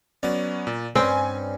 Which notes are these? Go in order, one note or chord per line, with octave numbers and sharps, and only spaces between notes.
F#3 B3 C#4 D5
A#2
G2 C4 C#4 G#5